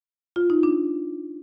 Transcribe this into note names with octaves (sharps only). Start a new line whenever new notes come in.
F4
D#4
D4